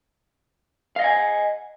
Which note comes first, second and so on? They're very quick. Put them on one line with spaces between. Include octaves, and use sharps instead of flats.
F5 D#5 F#5 G#5